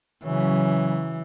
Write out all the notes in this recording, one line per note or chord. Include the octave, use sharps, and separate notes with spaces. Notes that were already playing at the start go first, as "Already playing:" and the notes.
C#3 E3 F#3 C#4